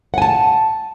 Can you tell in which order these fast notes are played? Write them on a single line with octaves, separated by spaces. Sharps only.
F#5 G#5 A5